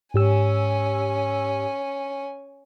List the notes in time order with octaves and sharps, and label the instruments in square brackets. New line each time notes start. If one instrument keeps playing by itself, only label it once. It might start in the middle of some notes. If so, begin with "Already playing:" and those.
[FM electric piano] G#2 G4 E6 [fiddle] C#4 G#5